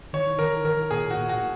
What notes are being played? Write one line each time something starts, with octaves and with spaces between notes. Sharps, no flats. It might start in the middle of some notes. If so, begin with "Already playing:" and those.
D#3 C#5
D#3 A#4
D#3 A#4
A#2 G#4
F#4
A#2
F#4